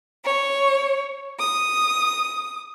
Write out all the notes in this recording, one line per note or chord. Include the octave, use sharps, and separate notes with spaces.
C#5
D#6